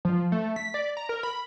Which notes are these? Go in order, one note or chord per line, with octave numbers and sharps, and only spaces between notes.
F3
A3
B6
D5
A#5
A#4
B5